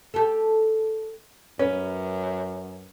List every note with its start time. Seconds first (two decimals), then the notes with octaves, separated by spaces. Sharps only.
0.14 G4 A4
1.59 F#2 C#4 B4